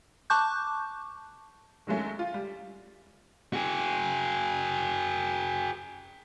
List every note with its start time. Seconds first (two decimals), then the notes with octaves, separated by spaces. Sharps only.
0.30 A5 C#6 D6 F#6 G6
1.87 D#3 F#3 G#3 A3 C#4
2.19 F4
2.34 G3
3.53 F#4 G#4